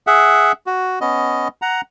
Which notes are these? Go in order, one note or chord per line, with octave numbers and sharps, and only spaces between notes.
G#4 E5 F#5
F#4
B3 C#4 D#5
F#5 A#5